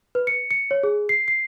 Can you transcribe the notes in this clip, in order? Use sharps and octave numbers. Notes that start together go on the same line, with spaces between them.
B4
C#7
C#7
C#5
G#4
C7
C7